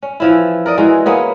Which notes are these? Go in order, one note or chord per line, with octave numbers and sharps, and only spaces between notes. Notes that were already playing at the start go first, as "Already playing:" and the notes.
C#4
E3 F3 E4
A#4 D5 D#5
E3 G#3 F#4
A#3 B3 C#4 G#4